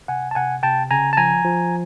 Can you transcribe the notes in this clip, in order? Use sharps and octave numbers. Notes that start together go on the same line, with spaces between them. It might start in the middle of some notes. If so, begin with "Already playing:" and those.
C3 F#5 G#5
A5
C3 F#5 G#5
C3 G5 A5
C#3 G#5 A#5
A5
F3 G#5 A#5
F3